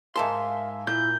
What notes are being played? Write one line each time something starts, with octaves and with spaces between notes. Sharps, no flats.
G#2 A#4 E5 F5 G#5 A5 C6
A#2 E4 G6